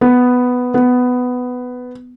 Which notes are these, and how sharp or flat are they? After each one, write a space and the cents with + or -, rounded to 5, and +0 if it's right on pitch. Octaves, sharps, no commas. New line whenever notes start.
B3 +5
B3 +10